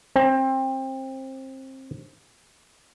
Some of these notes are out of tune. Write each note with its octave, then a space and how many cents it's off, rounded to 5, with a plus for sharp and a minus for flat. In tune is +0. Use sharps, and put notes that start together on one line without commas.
C4 +25